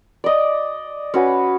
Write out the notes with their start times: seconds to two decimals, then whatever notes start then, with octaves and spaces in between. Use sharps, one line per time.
0.24 D5 D#5
1.14 C#4 F#4 B4